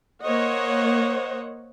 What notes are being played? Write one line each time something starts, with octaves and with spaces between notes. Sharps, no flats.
A#3 C5 C#5 D#5 F#5